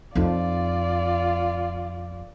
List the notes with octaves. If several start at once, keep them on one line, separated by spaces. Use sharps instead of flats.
F2 D#4 F4 D5